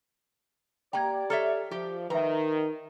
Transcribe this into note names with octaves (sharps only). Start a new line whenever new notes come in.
A#3 G4 D5 G5 A#5 G#6
A4 C#5 E5 A#5 F6
F3 G4
D#3 B4 E5 A#5